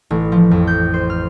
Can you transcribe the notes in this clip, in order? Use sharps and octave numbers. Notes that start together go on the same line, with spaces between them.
A1
F3
F2
G6
C5
F6